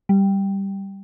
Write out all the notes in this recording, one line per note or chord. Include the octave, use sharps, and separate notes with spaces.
G3